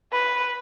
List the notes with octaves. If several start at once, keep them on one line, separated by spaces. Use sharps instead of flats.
B4